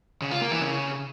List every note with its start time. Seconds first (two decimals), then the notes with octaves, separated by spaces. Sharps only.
0.22 C#3
0.31 F4
0.41 A#3
0.51 E3
0.61 C#3